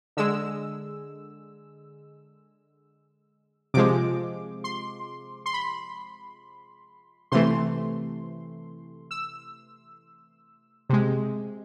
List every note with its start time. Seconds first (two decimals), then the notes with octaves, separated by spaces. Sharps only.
0.17 D3 G#3 E6
3.74 C3 F3 G#3 D6
4.64 C6
5.46 C6
5.53 B5
7.32 C3 E3 A3 C6
9.11 E6
10.90 C3 G#3